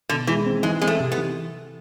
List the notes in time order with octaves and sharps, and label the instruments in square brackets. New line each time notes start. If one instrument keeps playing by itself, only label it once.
[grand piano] B2 [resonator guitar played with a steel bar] D3
[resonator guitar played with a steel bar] E3 [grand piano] G#3
[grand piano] C4
[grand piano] E3 [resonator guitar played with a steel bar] G#3
[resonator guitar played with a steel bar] G#3 [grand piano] C4
[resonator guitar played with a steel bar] A3
[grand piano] C3
[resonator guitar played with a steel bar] B3
[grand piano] E3